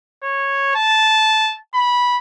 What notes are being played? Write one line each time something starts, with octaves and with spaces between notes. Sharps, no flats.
C#5
A5
B5